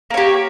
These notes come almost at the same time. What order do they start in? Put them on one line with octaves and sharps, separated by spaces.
A#3 C#5 G4